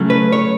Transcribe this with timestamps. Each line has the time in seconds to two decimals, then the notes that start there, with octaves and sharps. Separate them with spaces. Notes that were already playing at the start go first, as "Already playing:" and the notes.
Already playing: C#3 F#3 A3 C#4
0.10 B4
0.32 C#5